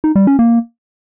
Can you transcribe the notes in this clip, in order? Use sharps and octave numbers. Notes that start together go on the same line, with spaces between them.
D#4
G3
C#4
A#3